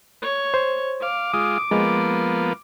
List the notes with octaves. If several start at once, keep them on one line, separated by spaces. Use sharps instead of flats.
C#5
C5
F5 D6
G#3 F4 D#6
F3 G#3 A#3 B3